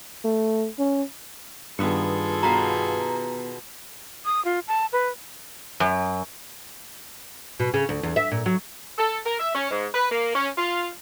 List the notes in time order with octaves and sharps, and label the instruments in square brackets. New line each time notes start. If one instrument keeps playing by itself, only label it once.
[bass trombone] A3
C#4
[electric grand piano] G2 [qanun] D#3 B3 C#6 [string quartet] F4 G#4 A4
[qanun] B2 B4 F5 [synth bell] A#5
[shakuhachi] D#6
F4
A5
B4
[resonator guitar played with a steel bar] F#2
[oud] B2
C#3
D2
E2
E5
A#2
F#3
[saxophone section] A4
A#4
E5
C#4
G#2
B4
A#3
C#4
F4